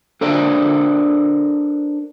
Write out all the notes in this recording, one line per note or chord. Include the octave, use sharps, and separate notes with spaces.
D4 A4 A#4 C5 D5